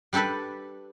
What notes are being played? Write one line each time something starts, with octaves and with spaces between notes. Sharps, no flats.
G3 D4 G4 A4 B4